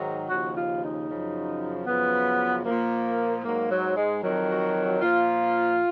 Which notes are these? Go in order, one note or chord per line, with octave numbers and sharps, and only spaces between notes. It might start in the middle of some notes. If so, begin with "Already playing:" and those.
Already playing: G#2 D#3 F#3
D#2 C#3 F3 F#4
F4
D#4
F#2 C#3 F3
F#2 C#3 F3 B3
A#2 F3 A#3
G#2 F#3 A#3
F#3
G#3
F2 D#3 F#3
F#4
A#2 F3 F4